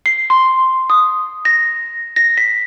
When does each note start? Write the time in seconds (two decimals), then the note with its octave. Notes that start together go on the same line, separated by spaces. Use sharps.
0.06 C7
0.30 C6
0.90 D#6
1.45 A#6
2.16 A#6
2.37 B6